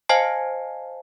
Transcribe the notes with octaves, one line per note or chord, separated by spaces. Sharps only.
C5 D#5 F5 G#5 A5 C7